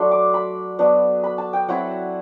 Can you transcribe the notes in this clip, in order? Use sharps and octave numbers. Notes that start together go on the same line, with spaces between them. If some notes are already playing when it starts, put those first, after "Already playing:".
Already playing: F#3 A3 D4 C6
D6
B5
F#3 B3 D4
B5
A5
G5
F#3 C4 E4 F#5